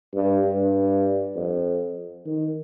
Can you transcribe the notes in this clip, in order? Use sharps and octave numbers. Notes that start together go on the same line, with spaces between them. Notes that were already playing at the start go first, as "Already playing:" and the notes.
G2
G2
F2
D#3